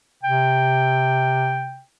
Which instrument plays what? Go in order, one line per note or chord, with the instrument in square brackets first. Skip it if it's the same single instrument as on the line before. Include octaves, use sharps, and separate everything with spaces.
[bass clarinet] C3 [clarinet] G5